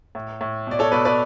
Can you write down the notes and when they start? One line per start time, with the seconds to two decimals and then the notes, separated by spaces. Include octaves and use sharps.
0.15 A2
0.41 A2
0.67 B2 D5
0.79 A4 C#5
0.92 B2 B4 D5
1.05 B4 D5